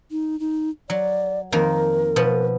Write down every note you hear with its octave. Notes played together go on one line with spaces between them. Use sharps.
D#4
D#4
F#3 D5
F2 D#3 A#3 A#4
B2 F3 B3